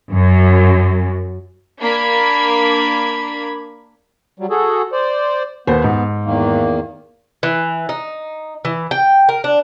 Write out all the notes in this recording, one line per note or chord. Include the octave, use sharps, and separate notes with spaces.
F#2
A#3 D4 B5 G#6
F#3 G3
F#4 G#4 A4
C5 D5
D#2 B3 B4 C5
G#2
E2 D#3 A#3
E3
D#4
E3
G5
A#4
D4